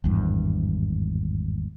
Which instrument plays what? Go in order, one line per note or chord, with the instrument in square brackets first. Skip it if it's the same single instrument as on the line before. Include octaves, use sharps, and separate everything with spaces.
[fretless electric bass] G#1 E2 G2